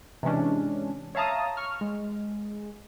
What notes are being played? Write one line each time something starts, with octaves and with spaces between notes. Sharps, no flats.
C3 E3 G#3 C#4 D4
C#5 E5 F5 A5 A#5 D#6
C#6 F6
G#3